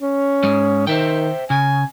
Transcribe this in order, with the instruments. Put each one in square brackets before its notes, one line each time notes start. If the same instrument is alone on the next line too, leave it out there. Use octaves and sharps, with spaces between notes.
[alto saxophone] C#4
[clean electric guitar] G#2 G#3
[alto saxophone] D#3 [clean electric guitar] C5 E5 G5
[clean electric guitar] C#3 [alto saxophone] G#5